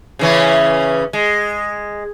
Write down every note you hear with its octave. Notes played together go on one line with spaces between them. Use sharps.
C#3 E3 C#4
G#3